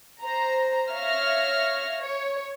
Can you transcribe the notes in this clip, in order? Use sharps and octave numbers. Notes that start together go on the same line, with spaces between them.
C5 A#5
C#5 E5 F5 F6 A#6
C#5